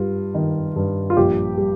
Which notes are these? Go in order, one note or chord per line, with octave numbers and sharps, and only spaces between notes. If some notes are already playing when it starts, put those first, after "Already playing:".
Already playing: G2 G3 F4
D#3
G2
F4
A#1 G4
G3